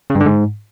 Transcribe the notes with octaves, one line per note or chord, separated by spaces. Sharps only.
C#3
G2
D3
G#2